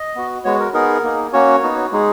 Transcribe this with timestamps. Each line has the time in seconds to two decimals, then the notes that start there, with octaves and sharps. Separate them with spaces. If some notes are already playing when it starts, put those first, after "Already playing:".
Already playing: D#5
0.15 B3 F#4
0.44 G#3 B3 F#4 C#5
0.60 A#4
0.74 B3 D#4 G#4 A#4
1.04 A#3 D#4 G#4
1.33 A#3 C#4 F#4 C#5
1.63 B3 D#4 F#4
1.92 G#3 D#4 G#4